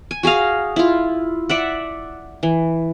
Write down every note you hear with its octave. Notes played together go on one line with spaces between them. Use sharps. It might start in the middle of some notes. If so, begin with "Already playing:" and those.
G#5
F#4 G#4 D#5 F5
E4 F4
D5 E5 F#5
E3